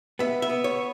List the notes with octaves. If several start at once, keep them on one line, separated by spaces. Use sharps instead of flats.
B3 E5
E5
B3
C#5